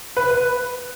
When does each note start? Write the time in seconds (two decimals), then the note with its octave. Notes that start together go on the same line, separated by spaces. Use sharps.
0.17 B4
0.31 B4